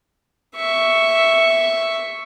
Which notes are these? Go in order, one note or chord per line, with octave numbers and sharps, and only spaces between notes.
E5 C#6